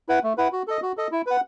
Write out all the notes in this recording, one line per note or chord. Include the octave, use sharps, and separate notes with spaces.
E4 B4 F#5
A3
E4 B4 F#5
F#4
A4 D#5
F#4
A4 D#5
E4
B4 F#5